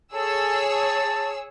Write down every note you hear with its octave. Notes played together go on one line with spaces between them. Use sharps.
G#4 A4 C#5 E6
A5